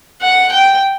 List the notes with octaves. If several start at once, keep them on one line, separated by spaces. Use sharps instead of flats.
F#5
G5